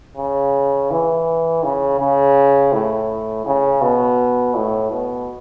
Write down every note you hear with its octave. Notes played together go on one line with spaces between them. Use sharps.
C#3
E3
C#3
C#3
A2
C#3
B2
A2
B2